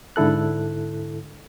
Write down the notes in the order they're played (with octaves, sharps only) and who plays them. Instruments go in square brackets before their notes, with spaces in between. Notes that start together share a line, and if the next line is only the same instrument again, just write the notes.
[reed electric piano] G#2 D3 E4 A4 F#6